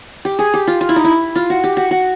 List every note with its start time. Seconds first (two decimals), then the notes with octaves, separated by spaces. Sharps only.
0.25 G4
0.39 G#4
0.54 G4
0.67 F4
0.81 F4
0.89 E4
0.96 D#4
1.04 E4
1.35 F4
1.50 F#4
1.64 G4
1.77 F#4
1.91 F#4